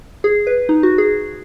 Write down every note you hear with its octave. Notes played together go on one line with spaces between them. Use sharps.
G#4
B4
D#4
F#4
G#4